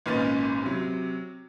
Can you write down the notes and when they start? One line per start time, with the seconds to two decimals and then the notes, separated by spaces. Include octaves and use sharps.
0.06 G#1 A#2 C#4 B4 D#5 A6
0.62 C3 F#3